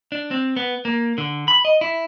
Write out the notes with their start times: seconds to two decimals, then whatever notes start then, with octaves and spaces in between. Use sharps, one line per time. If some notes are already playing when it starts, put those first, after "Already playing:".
0.12 D4
0.31 C4
0.57 B3
0.85 A#3
1.18 D3
1.48 B5
1.65 D#5
1.81 E4